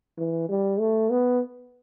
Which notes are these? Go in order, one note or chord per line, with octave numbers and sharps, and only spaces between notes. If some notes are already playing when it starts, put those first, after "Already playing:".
E3
G3
A3
B3